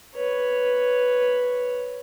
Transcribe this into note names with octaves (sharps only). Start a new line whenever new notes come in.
B4 C#5